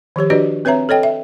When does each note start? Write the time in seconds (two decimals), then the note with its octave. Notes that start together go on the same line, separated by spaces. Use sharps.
0.16 D#3 F3 G4 C#5
0.30 D4 F#4 G4 B4 D5 D#5
0.65 C4 B4 C#5 E5 A#5
0.89 A4 C#5 D#5 G5
1.03 E5